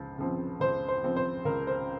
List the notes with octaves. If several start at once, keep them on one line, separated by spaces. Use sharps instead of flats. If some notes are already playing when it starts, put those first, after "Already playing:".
Already playing: C#2 F3
C#3 F3 C4
C#2 C5
C5
C#3 F3 C4
C5
C#2 A#4
C5